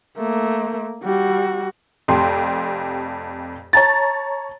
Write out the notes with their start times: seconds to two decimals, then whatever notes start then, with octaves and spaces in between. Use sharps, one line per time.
0.17 A3 A#3
1.03 G3 F#4
2.08 F1 F2 G4 C6
3.73 C#5 A5 A#5 A6